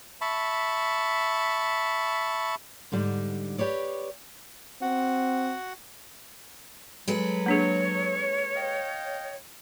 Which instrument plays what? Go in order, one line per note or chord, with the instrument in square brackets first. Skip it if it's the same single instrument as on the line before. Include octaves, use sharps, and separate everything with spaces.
[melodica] E5 A5 B5 C#6
[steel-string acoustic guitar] G#2 D3 G3
G4 B4 C#5 D5
[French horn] C4 [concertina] F#4 F#5
[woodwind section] F#3 [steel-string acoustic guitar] G#3 A4 B4
[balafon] A#3 D4 G#4 [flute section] C#5
[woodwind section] D#5 F5 G5